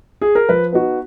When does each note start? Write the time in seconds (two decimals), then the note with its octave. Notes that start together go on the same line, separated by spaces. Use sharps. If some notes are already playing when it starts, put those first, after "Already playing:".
0.21 G#4
0.35 A#4
0.49 F3 B4
0.73 B3 D#4 F#4